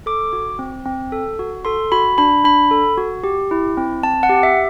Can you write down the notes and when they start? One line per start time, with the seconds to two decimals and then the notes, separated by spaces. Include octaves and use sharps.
0.06 A4 D6
0.33 F#4
0.59 C4
0.86 C4
1.12 A4
1.39 F#4
1.65 A4 C6
1.92 F#4 B5
2.18 D4 B5
2.44 D4 B5
2.71 A4
2.97 F#4
3.24 G4
3.51 E4
3.78 C4
4.03 C4 A5
4.23 F#5
4.29 G4
4.43 E5